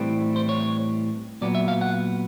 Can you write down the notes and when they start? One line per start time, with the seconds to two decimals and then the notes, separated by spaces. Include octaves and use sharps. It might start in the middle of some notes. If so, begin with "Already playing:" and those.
Already playing: A2 E3 G3 C4
0.36 C5
0.49 C#5
1.41 A#2 F#3 B3 D5
1.55 E5
1.68 F5
1.81 F#5